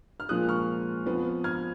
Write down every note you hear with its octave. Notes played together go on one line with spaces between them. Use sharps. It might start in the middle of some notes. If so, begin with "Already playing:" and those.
F6
A#2 F3 G#3 D#6 F#6
C#6 F6
F2 F3 B3
F6 G#6